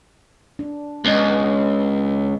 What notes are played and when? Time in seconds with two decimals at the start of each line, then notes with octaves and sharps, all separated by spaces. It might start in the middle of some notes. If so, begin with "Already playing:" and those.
0.59 D4
1.05 C#2 B3 D#5